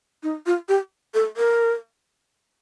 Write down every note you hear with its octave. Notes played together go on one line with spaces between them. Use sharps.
D#4
F4
G4
A4
A#4